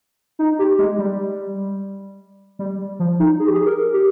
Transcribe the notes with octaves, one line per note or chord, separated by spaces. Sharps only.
D#4
G4
G#3
G3
G3
F3
D#4
G#4
G4
G#4
A#4
G4